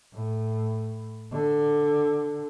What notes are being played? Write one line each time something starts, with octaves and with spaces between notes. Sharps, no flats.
A2
D3